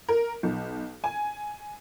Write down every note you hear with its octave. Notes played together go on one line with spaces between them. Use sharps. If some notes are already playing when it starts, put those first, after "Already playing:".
A#4
B1
G#5